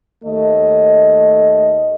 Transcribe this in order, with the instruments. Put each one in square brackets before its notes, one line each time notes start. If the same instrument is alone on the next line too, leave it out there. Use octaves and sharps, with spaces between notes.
[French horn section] D#2 A3 D#5